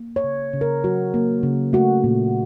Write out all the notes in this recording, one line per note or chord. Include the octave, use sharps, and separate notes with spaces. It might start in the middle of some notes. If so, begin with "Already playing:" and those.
Already playing: A#3
C#5
C#3
C#3
A#4
F#3 F#4
A#3
C#3
A3 F#4
A#2